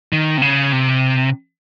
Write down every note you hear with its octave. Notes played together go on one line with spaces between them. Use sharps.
D#3
C3
C#3
C3